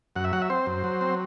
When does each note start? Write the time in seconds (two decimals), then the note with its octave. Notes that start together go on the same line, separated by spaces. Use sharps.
0.16 F#2 F#5
0.24 E5
0.33 F#3 F#5
0.42 E5
0.50 C4 C5
0.67 F#2
0.84 F#3
1.01 C4